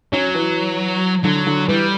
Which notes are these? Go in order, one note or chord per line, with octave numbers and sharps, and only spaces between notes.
F#3 C#4
E3
D3 F#3
D3
E3 G3